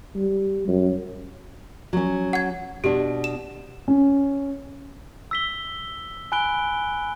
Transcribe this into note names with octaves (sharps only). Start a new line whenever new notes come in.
G3
F#2
F#3 C#4
F#5 G#6
B2 D4 G4
E7
C#4
E6 B6 G7
G#5 B5 F#6 D7 G7